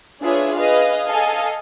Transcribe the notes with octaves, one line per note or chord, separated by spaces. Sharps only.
D4 F4 G#4 B4 C#5 E5
G#4 B4 D#5 F5
A4 D#5 F5 G#5